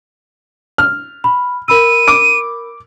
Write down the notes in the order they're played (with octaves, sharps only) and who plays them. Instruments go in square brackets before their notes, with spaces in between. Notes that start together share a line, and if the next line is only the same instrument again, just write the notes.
[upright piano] F6
[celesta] B5
[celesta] A#4 B5 E6 [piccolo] D#7
[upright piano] D6 D7